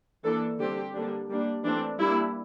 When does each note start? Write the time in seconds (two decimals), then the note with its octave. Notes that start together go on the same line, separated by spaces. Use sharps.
0.24 E3 A#3 D4 A4
0.59 D3 G3 C4 G4
0.94 D3 G3 A#3 D4
1.29 G3 A#3 D4
1.64 E3 A3 C4 D4
1.99 G3 A#3 D4 E4